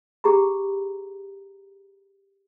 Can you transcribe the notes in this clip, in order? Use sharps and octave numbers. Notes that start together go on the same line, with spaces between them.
G4 G#4 A#5 B5